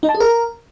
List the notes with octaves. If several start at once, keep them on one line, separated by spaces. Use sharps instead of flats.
D#4
A5
G#4
A#4